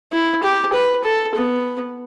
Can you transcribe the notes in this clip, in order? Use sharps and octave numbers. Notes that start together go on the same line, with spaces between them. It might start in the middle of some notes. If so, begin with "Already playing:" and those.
E4
G4
B4
A4
B3